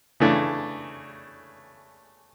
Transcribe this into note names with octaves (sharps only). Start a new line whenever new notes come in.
C#3 E3 A3 D4